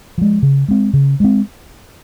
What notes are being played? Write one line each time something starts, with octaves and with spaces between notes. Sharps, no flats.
F3 G#3
C#3
G#3 C4
C#3
G#3 C4